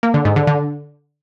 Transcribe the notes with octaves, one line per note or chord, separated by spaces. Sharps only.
A#3
D3
G#2
D3
D3